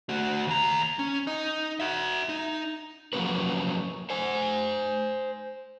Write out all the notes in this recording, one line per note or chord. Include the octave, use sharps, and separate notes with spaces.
A3 F#4
D#2 A#5
C#4
D#4
F#4 E5
D#4
F3 F#3 A#3 C#4 B4
C5 G#5